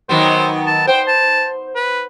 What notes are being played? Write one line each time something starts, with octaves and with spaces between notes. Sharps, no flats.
D#3 F#3 B3 C5
A5
C5 G5
A5
B4